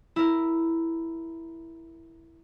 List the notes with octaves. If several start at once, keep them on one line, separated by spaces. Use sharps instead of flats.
E4 A#4